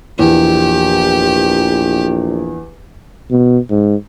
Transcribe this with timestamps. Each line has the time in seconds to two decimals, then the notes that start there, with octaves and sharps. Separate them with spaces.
0.19 A#1 E2 G4
3.31 B2
3.70 G#2